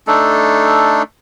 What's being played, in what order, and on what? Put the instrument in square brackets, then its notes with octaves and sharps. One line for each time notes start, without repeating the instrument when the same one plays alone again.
[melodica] A3 D4 D#4 A4